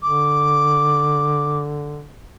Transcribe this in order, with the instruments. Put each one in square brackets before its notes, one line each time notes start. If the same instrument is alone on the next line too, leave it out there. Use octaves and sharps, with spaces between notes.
[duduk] D3 [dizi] D6